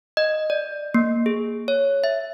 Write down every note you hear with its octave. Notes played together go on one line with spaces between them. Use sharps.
D#5
D5
A#3
G#4
C#5
E5